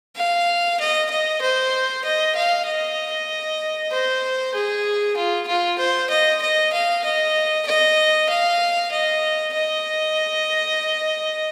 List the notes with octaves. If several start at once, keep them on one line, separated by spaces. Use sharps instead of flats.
F5
D#5
D#5
C5
D#5
F5
D#5
C5
G#4
F4
F4
C5
D#5
D#5
F5
D#5
D#5
F5
D#5
D#5